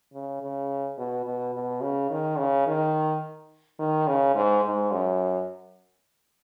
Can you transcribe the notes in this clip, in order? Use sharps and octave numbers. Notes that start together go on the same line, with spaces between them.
C#3
C#3
B2
B2
B2
C#3
D#3
C#3
D#3
D#3
C#3
G#2
G#2
F#2